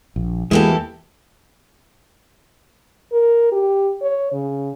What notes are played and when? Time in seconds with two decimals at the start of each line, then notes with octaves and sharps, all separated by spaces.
0.16 A#1
0.51 E2 E3 G#3 A#3 E4 F#4 G4 A4
3.12 A#4
3.52 G4
4.01 C#5
4.33 C#3